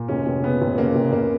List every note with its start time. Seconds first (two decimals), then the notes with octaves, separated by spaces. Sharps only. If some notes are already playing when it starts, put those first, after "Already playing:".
Already playing: A#2
0.08 F1 C#4
0.26 F1
0.43 C#3 B3
0.61 F1
0.78 C#3 A#3
0.95 F1
1.12 F1 A#3